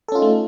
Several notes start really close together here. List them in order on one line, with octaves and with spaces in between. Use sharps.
A4 C#4 F4 D#4 A3